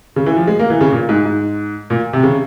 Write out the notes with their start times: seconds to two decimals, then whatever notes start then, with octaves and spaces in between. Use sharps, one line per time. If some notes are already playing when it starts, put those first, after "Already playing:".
0.16 C#3
0.26 E3
0.37 F3
0.48 G#3
0.59 A#3
0.70 E3
0.81 C#3
0.92 A#2
1.09 G#2
1.25 G#2
1.90 A#2
2.13 C3
2.23 C#3